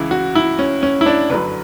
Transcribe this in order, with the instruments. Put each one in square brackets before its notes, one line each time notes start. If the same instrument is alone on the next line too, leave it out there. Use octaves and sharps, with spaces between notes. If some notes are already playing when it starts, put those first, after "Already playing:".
Already playing: [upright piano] C#2 C#3 E3 E4
F#4
E4
C#4
C#4
E4
D4
G1 F#2 D3 F#3 B4